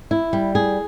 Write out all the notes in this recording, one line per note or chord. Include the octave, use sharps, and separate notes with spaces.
E4
G3
G#4